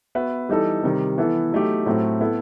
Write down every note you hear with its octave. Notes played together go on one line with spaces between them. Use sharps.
B3 F#4 B4 E5
E3 G3 D#4 A4
C3 D#3 G3
E3 B3 E4 A4
F#3 A3 D#4 G4
A2 F#3 A3 C4
B3 E4 A4